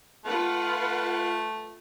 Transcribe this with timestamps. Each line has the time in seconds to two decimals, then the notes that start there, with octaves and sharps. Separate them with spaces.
0.25 A3 F4 B4 F#5